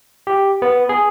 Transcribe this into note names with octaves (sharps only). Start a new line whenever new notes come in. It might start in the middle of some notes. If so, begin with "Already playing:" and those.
G4
B3
G#4